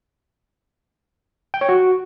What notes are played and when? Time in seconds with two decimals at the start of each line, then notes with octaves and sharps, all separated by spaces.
1.54 G5
1.61 C#5
1.69 F#4